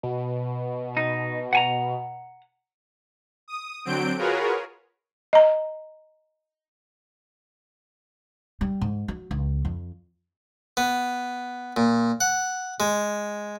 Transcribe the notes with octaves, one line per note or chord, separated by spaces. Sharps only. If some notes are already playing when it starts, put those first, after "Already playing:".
B2
D#4
F#5 G#5 A#5
D#6
D3 F#3 C4 G6 D7
F4 F#4 G#4 A#4 B4 C#5
D#5 A#5
G3
G#2
F#3
C#2
F2
B3
A#2
F#5
G#3